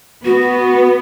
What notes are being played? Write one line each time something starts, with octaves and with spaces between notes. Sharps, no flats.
B3 F#4